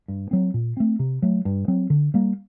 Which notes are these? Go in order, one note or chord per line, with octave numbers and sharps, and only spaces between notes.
G2
F#3 C4
A#2
A3 C4
C3
F#3 A3
G2
F#3 C4
D3
G3 A#3